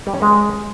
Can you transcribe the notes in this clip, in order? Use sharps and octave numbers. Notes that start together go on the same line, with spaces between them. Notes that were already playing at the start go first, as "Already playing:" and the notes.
G3
C#4
G#3